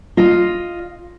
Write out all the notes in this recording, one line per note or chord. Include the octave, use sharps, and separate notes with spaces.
F4 D#5